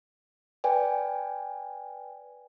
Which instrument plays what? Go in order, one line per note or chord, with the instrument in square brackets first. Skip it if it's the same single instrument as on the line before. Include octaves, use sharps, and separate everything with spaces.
[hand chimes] B4 D5 G5 G#5